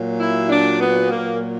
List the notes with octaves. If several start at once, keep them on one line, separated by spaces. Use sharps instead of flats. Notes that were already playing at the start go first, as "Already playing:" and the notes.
Already playing: A#2 F#3
E4
D4
B3
A#2 F#3 A#3